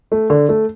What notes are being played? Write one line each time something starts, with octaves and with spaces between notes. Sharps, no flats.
A3
D3
A3